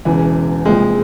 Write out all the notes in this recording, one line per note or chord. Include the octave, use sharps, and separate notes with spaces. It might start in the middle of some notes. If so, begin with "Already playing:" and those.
E1 E2 C#3 E3
C2 A#2 F3 G#3